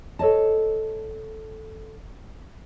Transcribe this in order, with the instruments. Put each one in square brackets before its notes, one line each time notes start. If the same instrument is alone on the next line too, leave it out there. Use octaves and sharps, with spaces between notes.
[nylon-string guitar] A4 C#5 D#5 A5